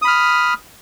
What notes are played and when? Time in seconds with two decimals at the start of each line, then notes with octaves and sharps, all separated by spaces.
0.02 D#6
0.05 B5
0.07 F6